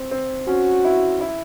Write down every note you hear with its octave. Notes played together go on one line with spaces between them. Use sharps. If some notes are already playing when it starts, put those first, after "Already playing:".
Already playing: C4
C4
C#4 F#4
E4
E4